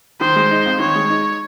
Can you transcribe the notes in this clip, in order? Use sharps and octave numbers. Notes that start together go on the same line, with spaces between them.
D#3 C5
G#3
D#4
F2
D#3 C#5
G#3
D#4